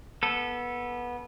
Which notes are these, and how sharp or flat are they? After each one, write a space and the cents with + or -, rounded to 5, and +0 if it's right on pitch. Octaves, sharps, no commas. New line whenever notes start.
B3 -20 A4 +0